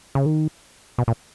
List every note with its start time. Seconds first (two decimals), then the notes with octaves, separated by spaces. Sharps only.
0.15 C#3
0.26 D#3
0.98 B2
1.08 A#2